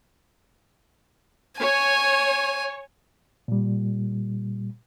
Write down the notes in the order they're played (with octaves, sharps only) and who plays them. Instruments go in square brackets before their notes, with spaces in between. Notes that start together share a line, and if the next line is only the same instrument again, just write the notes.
[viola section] C#5 [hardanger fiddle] G#5
[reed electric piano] A#2 G3